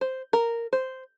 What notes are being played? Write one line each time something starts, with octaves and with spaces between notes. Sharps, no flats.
C5
A#4
C5